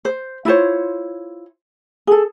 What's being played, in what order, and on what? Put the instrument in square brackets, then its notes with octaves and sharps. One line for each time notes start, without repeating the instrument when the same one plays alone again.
[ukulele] C5
E4 F4 C5 C#5
G#4 A4